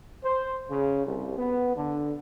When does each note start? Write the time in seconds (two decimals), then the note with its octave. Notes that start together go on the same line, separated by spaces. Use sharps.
0.25 C5
0.70 C#3
1.06 C2
1.37 B3
1.76 D3